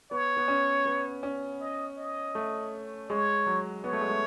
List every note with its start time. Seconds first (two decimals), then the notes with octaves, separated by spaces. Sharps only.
0.11 B3 C#5
0.37 B3
0.48 C#4
0.86 B3
1.23 C#4
1.61 D#5
1.98 D#5
2.35 A3
3.09 G#3 C#5
3.46 F#3
3.84 B3 C#5
3.93 A3
4.01 G#3
4.09 A3